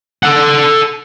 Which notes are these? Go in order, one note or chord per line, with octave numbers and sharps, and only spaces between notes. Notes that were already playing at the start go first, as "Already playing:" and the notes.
A4 F#5